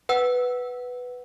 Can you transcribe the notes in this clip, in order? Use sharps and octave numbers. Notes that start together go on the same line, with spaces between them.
B4 F#5 E6